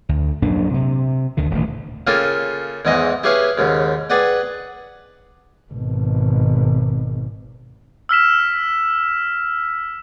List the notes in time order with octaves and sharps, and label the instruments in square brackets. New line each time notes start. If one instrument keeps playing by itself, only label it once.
[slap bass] D2
A#1 F#2 A#3 D4
C3
D2 D3 D#3
D#1 A1 D2
[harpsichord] C#3 A#3 F4 A4 G5 G#5
E2 G#2 E3 D#4 D#5
E4 G4 G#4 B4 C#5 F5
D#2 G#2 C#3
G#4 B4 D5 F#5 G5
[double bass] G#1 B2
[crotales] E6 F6 B6 E7